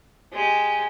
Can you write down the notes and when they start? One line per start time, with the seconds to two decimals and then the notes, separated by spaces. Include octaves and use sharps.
0.33 G#3 G4